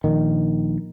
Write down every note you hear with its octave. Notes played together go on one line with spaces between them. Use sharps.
A#1 D#3